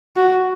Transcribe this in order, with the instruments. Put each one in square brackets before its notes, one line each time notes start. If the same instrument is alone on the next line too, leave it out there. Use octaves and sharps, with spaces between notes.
[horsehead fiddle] F#4